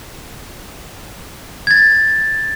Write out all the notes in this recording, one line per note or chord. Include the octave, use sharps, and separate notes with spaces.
G#6 A6